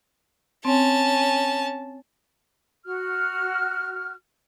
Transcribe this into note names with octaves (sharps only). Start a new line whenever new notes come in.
C4 C#4 A5
F#4 F6